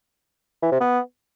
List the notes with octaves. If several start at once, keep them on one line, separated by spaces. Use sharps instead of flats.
E3
C3
B3